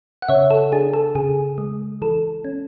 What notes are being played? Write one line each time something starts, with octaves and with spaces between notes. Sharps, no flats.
F#5
C#3 C#5 E5
A4
D4 G#4
A4
C#3 G#4
G#3
E3 A4
C#4